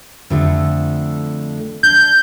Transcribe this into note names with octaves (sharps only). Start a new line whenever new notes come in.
F2 D3 A3
D4 G6